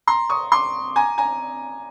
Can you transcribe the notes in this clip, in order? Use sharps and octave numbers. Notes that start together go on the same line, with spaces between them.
A#5 C6
C#6 D#6
C6 D6
G#5 A#5
G#5 A#5